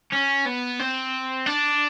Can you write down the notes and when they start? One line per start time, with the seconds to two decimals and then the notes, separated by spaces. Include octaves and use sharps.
0.13 C#4
0.46 B3
0.79 C4
1.46 D4